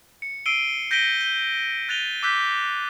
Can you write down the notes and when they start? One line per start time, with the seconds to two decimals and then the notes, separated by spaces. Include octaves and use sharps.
0.22 C#7
0.46 E6 C7 D7 D#7 G7
0.91 G6 A#6 B6 D7 D#7 G7
1.21 G6 G7
1.89 F#6 A6 D#7 F7 G7
2.23 D6 E6 F#6 G6 B6 G7